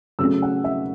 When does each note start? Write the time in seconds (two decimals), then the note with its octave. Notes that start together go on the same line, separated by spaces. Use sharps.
0.19 C#3 F#3 A3 C#4 E6
0.42 F#5
0.64 E5